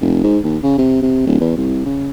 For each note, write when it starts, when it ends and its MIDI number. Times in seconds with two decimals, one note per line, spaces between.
0.01 0.20 29
0.24 0.38 44
0.44 0.57 39
0.63 0.75 49
0.78 1.00 48
1.02 1.25 48
1.27 1.38 26
1.41 1.55 40
1.57 1.84 36
1.86 2.11 49